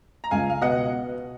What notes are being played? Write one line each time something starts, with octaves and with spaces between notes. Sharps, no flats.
A#5
C#2 F5 G#5
F5
B2 D#5 F#5